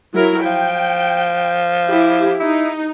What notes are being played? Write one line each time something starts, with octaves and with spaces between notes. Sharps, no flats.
F#3 E4 A#4
F3 G5
E4 G4
D#4 E4